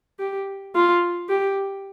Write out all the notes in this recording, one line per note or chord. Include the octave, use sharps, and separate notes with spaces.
G4
F4
G4